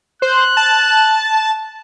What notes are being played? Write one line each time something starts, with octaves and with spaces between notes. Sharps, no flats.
C5 F#6
A5